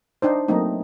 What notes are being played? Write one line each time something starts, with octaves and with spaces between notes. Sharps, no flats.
D4 D#4 C5
F#3 A3 A#3 C4 D#4